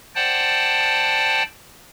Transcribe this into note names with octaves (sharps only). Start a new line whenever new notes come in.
C5 D5 F#5 G5 A5